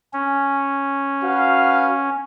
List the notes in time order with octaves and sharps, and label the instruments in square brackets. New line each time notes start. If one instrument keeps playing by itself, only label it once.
[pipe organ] C#4
[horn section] F#4 B4 F5